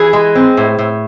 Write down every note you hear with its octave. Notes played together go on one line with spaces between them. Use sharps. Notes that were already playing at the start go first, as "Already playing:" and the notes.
Already playing: E3 G#4
G#3
C4
A2
A2